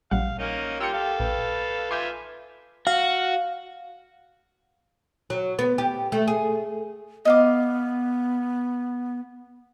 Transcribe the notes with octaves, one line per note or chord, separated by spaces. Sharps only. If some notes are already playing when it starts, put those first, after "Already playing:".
A#1 G3 F5 F#5
A#3 C#4 D#4
A#3 F4 G4 E6 C#7
A4 F5
A#1 B4
F4 E5 G#5 C6 D6 G6
F#4 F5
F#3
B3
G4
A3
G#4
B3 D#5 F5 D6